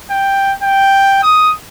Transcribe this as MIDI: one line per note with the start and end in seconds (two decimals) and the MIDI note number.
0.10 0.53 79
0.63 1.20 79
1.23 1.51 87